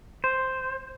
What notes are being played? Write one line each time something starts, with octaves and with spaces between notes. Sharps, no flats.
C5